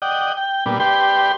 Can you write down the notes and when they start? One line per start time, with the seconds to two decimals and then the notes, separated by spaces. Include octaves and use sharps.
0.02 D5 D#5 F#5 G5
0.37 G5
0.66 A#2 G3 B3 D4
0.80 G4 B4 D5 G5 C6